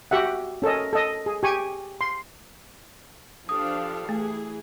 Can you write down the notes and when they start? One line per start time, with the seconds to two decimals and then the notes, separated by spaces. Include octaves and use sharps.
0.11 F#4 G4 E5 F#5
0.62 C#4 A4 A#4 D#5
0.93 A4 D#5
1.26 G#4
1.43 G4 G#5 C#6
2.01 C6
3.49 F3 D4 G4 A4 F5 D#6
4.09 E3 A3 G#4